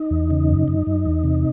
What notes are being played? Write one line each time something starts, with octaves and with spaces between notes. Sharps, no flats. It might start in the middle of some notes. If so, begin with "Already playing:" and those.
Already playing: D#4
E2
C#3
F#2
F#2
F#2
E2
C3